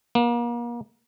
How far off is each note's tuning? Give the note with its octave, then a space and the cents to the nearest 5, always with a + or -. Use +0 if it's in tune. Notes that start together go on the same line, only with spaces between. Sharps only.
A#3 +35